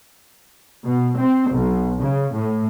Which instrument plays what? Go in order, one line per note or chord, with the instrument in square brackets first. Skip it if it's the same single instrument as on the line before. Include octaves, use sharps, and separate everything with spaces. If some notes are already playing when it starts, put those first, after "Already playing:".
[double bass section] B2
C4
B1
C#3
A2